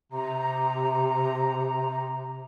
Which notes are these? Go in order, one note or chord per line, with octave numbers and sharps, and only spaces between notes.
C3 A#5